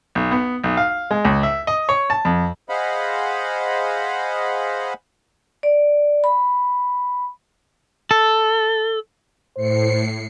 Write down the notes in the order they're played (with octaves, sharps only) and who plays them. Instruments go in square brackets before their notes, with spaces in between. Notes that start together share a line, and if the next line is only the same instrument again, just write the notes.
[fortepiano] B1
B3
B1
F5
G#3
C#2
E5
D#5
C#5
A5
F2
[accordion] G#4 C5 D#5 F5 F#5 B5
[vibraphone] D5
B5
[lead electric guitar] A4
[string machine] A2 C7 C#7 [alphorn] C5